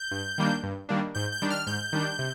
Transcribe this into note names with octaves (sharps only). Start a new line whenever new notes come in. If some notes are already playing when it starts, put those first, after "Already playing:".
Already playing: G6
G2
D#3 G3 A#3 D4
G2
D#3 G3 A#3 D4
G#2 G6
G6
D#3 G3 D4
F6
G#2 G6
D#3 G3 D4
C3